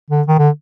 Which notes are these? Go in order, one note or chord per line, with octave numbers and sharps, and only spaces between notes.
D3
D#3
D3